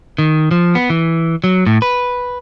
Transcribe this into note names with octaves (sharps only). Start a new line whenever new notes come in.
D#3
F3
B3
E3
F#3
A2
B4